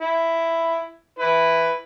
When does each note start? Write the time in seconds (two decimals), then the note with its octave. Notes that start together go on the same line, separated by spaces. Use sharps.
0.01 E4
1.19 E4 B4